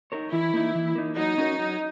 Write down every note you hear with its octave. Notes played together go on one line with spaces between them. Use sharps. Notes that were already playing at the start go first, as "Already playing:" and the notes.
D#4 A#4 C#5
E3 E4
A#3 D#4
E3
A#3 D#4
F#3 D#4
C#4 F#4 A#4 C#5
F#3